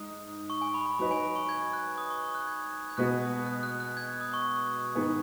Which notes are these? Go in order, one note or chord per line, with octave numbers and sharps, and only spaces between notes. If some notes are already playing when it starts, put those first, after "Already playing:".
Already playing: G#2 D#6
C#6
G#5
B5
B5
F#3 D#4 B4 D#5 B5
G#5
B5
C#6
G#6
F#6
D#6
C#6
C#6
F#6
G#6
G#6
B2 G#3 B3 F#4 F#6
D#6
F#6
F#6
F#6
G#6
F#6
D#6
C#6
G#2 D#3 B3 G#4